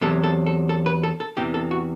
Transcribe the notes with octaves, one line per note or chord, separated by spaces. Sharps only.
E2 C3 F#3 A4
A4
A4
A4
B4
A4
A4
E2 C3 E3 G4
A4
F#4